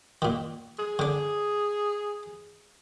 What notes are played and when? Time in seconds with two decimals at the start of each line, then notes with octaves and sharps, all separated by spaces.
0.22 A#2 D#3
0.79 G#4
0.99 D3 D4